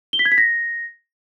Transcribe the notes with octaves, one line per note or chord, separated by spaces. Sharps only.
G7
B6
G#6
B6
A#6